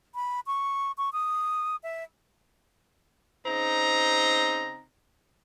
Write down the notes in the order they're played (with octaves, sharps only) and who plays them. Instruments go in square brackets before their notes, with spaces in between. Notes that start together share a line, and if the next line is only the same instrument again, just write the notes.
[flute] B5
C#6
C#6
D#6
E5
[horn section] C#3 C4 D#4 A#5